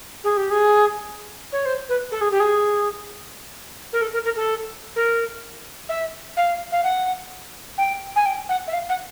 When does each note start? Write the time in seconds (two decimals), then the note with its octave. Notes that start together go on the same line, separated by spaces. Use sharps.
0.24 G#4
0.37 G4
0.50 G#4
1.52 C#5
1.65 C5
1.89 B4
2.11 A4
2.21 G#4
2.31 G4
2.40 G#4
3.93 A#4
4.01 A4
4.13 A#4
4.24 A#4
4.36 A4
4.96 A#4
5.89 E5
6.37 F5
6.72 F5
6.83 F#5
7.78 G5
8.16 G#5
8.25 G5
8.49 F#5
8.67 E5
8.73 F5
8.89 F#5